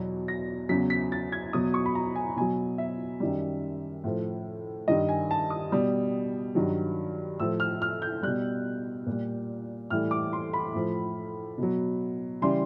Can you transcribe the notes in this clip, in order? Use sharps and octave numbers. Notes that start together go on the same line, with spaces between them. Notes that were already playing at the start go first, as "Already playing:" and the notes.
Already playing: E2 B2 F#3
A#6
E2 C#3 F#3 B6
B6
A6
G#6
E2 B2 F#3 D#6
C#6
B5
A#5
G#5
B2 F#3 G#5
E5
F#2 D#3 G3
A2 F3
G2 D#3 G3 D#5
G#5
A5
D#6
B2 G3
G2 D#3 F#3
A2 F3 E6
F6
F6
G6
B2 G3 F#6
A#2 G3
A2 E3 G3 F6
D6
C6
B5
A2 F3
B2 F#3
C#3 E3 G3 C6